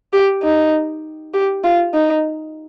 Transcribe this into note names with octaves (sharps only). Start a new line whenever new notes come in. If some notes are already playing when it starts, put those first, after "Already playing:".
G4
D#4
G4
F4
D#4